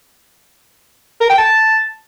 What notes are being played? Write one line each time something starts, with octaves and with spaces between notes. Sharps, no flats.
A#4
G5
A5